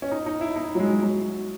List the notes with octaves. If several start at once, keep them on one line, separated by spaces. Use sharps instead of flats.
C#4
D#4
D#4
E4
D#4
F#3
G#3
F#3